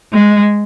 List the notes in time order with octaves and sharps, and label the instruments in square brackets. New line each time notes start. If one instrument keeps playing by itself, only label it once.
[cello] G#3